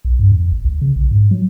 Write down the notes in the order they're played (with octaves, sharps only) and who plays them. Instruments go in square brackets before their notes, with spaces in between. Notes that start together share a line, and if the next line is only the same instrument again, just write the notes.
[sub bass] B1
G2
F2
G#1
C#2
C#3
A#1
G#2
F#3